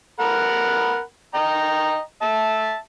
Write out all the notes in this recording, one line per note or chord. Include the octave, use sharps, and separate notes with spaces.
A#4 F#5 B5
D#5 G5 A#5
E5 A5